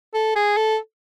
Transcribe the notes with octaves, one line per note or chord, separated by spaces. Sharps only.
A4
G#4
A4